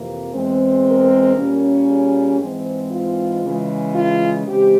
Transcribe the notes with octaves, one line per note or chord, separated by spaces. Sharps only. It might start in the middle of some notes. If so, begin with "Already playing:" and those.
Already playing: F2 C3 E3 A#3
E2 E3 G#3 C4
A#4
A#2 G3 A#3 C#4
G#4
G#2 E3 G#3 C4
F4
C#3 E3 G#3
F4
C#3 E3 G#3 C4 G4